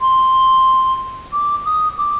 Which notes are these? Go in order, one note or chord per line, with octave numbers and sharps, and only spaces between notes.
C6
D6
D#6
D6